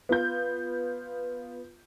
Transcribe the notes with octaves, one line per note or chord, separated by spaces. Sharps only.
B3 F4 G6